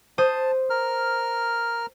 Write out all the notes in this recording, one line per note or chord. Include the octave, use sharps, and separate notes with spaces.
C5 A5 D#6
A#4 F6